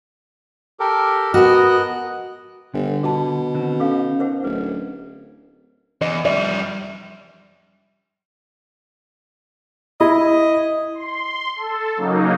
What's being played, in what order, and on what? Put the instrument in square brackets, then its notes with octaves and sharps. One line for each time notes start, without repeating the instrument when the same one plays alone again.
[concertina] G4 A4 A#4
[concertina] B3 D#5 F#6 [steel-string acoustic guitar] F#4 A#4
[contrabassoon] G1 [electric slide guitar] D3
[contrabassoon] B2 [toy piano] F4 A5
[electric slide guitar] D3 D#3 C4
[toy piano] C#4 A4 F5 [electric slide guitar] D#4
[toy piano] A#4 C5 F#5
[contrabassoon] D1 [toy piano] B4
[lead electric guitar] E2 [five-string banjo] D#5
[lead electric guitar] F2 G3 [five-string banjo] D5 E5
[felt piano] E4 [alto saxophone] D#5
[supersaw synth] C6
A4
C#3 F#3 A#3 D#4